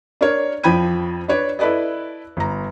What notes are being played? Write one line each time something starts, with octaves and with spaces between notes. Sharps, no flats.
D4 A#4 C#5
F2 F3 G5 B5 G#6 D#7
D4 B4 C#5 D5
E4 A4 B4 D5 D#5
G1 A#5